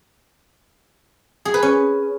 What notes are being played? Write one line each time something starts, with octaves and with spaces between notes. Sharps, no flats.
G#4
B4
C#4